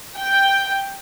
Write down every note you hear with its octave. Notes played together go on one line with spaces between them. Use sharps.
G5